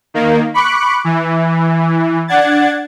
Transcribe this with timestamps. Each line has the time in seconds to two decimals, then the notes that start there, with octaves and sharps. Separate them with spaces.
0.14 D#3 A#3
0.54 B5 C#6 D6 F#6
1.04 E3
2.28 D4 F#5 G#6 A6